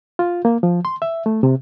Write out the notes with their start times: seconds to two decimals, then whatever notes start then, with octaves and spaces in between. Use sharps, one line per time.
0.19 F4
0.45 A#3
0.63 F3
0.85 C6
1.02 E5
1.26 A3
1.43 C3